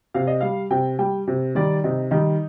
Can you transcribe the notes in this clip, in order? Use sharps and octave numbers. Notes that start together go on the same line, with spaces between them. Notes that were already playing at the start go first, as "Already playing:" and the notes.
C3 F5
D#5
G3 F5
C3 G5
G3 G5
C3
D#3 G3 D5
C3 D#4
D#3 G3 D#4